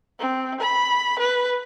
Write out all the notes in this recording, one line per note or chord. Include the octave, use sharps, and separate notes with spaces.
C4
B5
B4